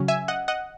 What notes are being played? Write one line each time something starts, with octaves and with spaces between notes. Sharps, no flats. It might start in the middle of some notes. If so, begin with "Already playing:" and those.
Already playing: C#3 F#3 C#4
E5 G#5
D#5 F#5
D#5 F#5